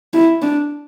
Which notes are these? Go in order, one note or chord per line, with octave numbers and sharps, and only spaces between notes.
E4
D4